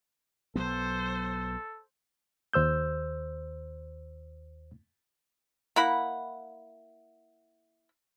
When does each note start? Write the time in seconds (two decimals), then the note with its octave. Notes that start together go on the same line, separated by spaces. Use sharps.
0.56 B1 F#3 B3 A4 C5
2.53 D#2 C5 E6 G6
5.76 A#3 E4 F#5 B5